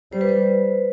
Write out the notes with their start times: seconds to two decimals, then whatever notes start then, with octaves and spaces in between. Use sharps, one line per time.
0.13 G3 C5
0.21 B4
0.29 C5